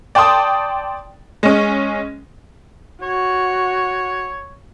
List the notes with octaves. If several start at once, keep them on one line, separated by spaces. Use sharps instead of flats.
D5 G5 A5 C6 D#6
G#3 C#4
F#4 C#5